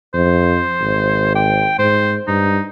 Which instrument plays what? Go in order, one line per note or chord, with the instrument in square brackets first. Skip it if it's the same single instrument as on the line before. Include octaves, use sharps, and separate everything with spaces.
[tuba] F2 [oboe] C5
[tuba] G#1
[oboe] G5
[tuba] G#2 [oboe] C5
[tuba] G2 [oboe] D#4